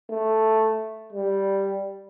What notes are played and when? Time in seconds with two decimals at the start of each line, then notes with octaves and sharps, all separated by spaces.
0.10 A3
1.13 G3